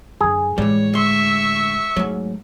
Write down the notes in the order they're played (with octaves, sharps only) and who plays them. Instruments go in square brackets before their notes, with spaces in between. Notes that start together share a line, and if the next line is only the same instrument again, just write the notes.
[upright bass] F#2 D3 [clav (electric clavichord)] G#4
[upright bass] A2 G#3 [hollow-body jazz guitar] E3 G3 [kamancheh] C#5
[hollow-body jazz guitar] D2 C6 [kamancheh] E5 C#6
[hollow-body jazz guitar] G#2 F#3 [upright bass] A3